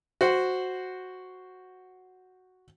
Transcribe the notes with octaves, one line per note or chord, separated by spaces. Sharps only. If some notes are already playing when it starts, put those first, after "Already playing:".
F#4 C5 F#5